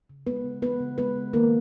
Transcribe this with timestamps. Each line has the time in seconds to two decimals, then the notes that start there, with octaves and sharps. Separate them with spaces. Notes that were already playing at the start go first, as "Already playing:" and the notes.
0.10 C#3
0.27 G#3 B3 B4
0.44 C#3
0.62 E3 B3 B4
0.80 C#3
0.98 G#3 B3 B4
1.16 C#3
1.33 D#3 A#3 A#4